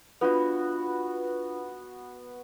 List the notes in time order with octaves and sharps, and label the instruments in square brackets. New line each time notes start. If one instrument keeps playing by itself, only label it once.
[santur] B3 F#4 [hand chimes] D4 F4 B4